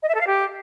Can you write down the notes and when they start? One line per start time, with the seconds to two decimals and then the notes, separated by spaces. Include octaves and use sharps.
0.02 D#5
0.08 E5
0.14 A4
0.21 F5
0.27 G4